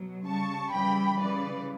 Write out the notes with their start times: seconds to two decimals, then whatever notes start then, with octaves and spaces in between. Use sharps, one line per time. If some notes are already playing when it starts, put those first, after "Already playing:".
Already playing: B2 F#3
0.26 C#3 G3 A5 C#6
0.73 C#3 E3 G3 G5 B5
1.19 C#3 E3 G3 B4 D5